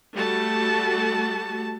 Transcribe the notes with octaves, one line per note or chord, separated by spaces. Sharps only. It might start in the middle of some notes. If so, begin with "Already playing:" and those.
G3 A3 F#4 A5